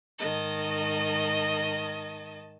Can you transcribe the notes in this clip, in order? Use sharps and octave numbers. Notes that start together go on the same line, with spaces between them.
G#2 D#3 D#5 A5